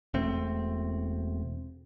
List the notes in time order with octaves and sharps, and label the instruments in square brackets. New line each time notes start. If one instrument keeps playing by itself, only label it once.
[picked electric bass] E1 A3 C4